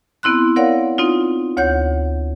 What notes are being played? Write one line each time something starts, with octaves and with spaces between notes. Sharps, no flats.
B3 C4 E4 C6 F#6
A#4 C#5 D5 F5 F#5
C4 D#4 F4
D2 C#5 F#5 G6